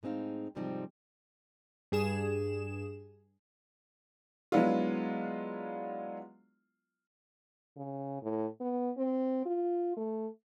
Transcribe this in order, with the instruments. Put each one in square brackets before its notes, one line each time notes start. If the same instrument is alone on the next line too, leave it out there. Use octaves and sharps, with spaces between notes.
[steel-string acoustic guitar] A2 G#3 C4 D#4 F5
G#2 C3 F3 G3 C4 D#4
[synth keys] G2 G#4 E7
[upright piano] F#3 G#3 B3 D4 E4 F4
[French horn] C#3
A2
B3
C4
F4
A3